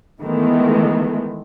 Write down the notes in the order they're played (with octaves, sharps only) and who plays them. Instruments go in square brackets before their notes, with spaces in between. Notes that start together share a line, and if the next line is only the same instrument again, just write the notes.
[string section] D#3 E3 G#3 A3 B3